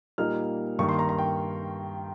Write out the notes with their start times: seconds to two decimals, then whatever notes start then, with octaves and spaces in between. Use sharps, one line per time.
0.18 A#2 G3 A#3 D#4 F6
0.79 G2 D#3 A#3 C#6
0.89 C6
0.99 A#5
1.09 A#5
1.18 G5